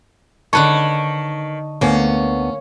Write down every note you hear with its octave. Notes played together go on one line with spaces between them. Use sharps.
D3 D#3 B4 C#5 A5 C#6
D2 A#3 B3 C#4